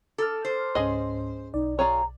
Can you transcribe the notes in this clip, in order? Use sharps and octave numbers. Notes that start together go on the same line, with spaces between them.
A4 D6 F6
C5
C#2 G#2 C#4 G#4 D#5
B1 D#4 D5
F4 G#4 C#5 A#5